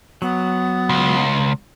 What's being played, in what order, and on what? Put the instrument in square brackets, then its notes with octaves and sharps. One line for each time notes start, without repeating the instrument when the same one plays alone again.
[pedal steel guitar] F#3 [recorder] B3
[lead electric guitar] C#2